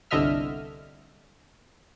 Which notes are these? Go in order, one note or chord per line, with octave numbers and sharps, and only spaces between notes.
G1 C2 D3 D#5 E5 F6